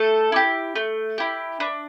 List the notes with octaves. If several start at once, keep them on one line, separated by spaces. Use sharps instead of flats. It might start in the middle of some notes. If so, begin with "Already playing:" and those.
Already playing: A3 A4
E4 G4
A3
E4 G4
D4 B4